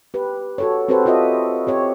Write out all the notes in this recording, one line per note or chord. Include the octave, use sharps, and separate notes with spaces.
G4 B4
F#4 A4 C#5
C4 F#4 G4 A4 B4 C5
F4 F#4 A4 D#5 E5
C4 G4 C#5